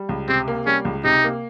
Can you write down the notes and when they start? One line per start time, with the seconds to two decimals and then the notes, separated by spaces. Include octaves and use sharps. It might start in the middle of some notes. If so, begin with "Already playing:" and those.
Already playing: G3
0.09 C#2
0.28 C3 C4
0.48 A#3
0.66 G3 C#4
0.85 C#2
1.04 C3 D#4
1.24 A#3